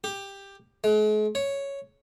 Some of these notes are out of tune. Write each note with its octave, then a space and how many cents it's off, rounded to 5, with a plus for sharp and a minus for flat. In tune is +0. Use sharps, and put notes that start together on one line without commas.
G4 +10
G#3 +45
C#5 +0